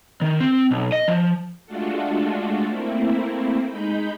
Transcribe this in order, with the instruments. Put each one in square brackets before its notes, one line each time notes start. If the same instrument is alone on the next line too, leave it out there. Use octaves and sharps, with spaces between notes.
[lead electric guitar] D#3
C4
B1
D#5
F3
[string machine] G#3 A3 D4 F4 F#4 A4
A3 A#3 C4 E4
G#3 D#4 B5 G6